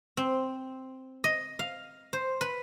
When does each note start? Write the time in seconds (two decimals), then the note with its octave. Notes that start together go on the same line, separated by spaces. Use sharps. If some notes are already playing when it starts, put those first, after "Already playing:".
0.17 C4
1.24 D#5
1.59 F5
2.13 C5
2.41 B4